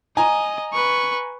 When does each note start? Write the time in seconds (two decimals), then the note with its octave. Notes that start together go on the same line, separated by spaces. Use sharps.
0.17 D#5 G#5 A#5
0.73 B4 C#6